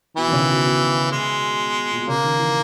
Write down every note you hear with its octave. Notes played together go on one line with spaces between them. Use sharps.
B2 E3
D#3
C#3
B2
B2
G#3
A#2
B2
C#3 A#3
D#3
E3